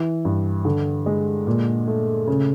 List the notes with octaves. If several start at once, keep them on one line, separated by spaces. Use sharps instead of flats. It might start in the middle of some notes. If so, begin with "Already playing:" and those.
Already playing: E3
G2
D3
G#3
A#2
A3
C#3